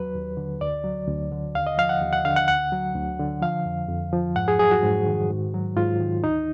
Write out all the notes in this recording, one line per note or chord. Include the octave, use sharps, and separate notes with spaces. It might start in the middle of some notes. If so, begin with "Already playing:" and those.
Already playing: D#2 F#3 B4
D#2
D3
D2 D5
F#3
D2
D3
D#2 F5
D#5
F3 F5
F#5
D#2
F#5
D3 F5
F#5
D2 F#5
F#3
D2
D3
F3 F5
F2
F2
F3
G#2 F#5
G#4
F#3 G#4
F#4
G#2
D#3
G#2
F#3
G#2 F4
D#3
D2 D#4